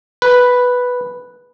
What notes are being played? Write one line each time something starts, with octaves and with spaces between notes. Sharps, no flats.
B4